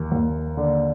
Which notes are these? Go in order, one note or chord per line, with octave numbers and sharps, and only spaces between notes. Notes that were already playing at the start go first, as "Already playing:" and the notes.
Already playing: D#2
D#2
D3